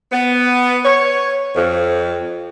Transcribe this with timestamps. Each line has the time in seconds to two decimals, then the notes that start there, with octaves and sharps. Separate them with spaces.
0.12 B3
0.84 C#5
1.55 F2